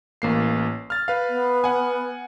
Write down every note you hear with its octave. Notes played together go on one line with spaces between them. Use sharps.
A1 A#3 C7
F6 A6
B4 F5
B3
F#5 G#5